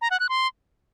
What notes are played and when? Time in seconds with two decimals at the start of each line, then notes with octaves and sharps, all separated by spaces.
0.01 A#5
0.11 F#5
0.20 F#6
0.29 C6